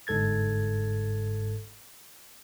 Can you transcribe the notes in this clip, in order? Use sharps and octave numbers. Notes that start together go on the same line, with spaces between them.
G1 G#2 A4 G#6 A6